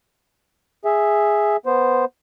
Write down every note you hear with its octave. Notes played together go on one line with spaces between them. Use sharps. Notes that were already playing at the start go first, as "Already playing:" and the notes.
G#4 E5
B3 C5